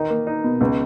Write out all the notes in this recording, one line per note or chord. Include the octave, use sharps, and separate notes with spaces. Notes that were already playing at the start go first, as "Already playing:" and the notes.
Already playing: D#3 D#4
A#3
D#4
B2
C#2